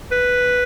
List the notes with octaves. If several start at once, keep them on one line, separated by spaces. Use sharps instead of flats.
B4